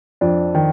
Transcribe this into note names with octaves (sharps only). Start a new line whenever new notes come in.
F2 D4
D#3